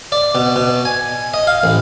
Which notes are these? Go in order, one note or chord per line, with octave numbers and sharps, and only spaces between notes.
D5
B2
B2
G#5
D#5
F5
A1